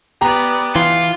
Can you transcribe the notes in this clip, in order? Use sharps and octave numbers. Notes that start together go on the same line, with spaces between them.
B3 G4 D5 A#5
E3 F4